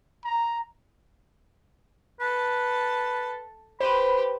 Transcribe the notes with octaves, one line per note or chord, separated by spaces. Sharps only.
A#5
A4 B4 A5
G4 B4 C5 B5